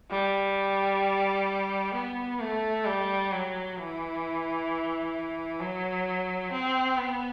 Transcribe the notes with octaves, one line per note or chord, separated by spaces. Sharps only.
G3
B3
A3
G3
F#3
E3
F#3
C4
B3